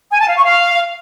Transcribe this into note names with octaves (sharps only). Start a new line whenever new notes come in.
G#5
A5
F5
C#6
F5